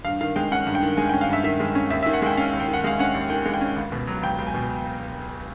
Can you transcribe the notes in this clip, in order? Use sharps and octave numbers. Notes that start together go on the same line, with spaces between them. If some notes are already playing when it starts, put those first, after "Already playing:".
G2 F5
D#3 F5
G#3 G5
C#4 F#5
G2
G5
D#3
G#3 G#5
G5
C#4
F5
G2 E5
D#3 E5
G#3
C#4
D#2 E5
E5
D#3
F#5
G#3 G5
C#4 F5
D#2
G5
D#3
F#5
G#3 F5
C#4 F#5
D#2
D#3 G5
G#3
G5
C#4
C#2
B2
F#3
C#2 G5
C#2
G#5
B2